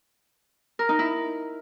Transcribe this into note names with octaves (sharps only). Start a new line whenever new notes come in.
A#4
D#4
E4